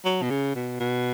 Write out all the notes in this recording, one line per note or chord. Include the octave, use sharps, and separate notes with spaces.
F#3
B2
C#3
B2
B2